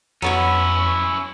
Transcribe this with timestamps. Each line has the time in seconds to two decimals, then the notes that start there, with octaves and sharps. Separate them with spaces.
0.22 F2 F#3 B3 C#4 E4 C#5